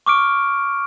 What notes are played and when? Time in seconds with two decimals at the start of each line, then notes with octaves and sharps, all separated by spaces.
0.06 C#6 D6 F6 D7